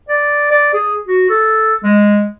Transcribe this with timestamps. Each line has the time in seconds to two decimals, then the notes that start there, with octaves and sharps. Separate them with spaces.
0.09 D5
0.51 D5
0.73 G#4
1.07 F#4
1.29 A4
1.83 G#3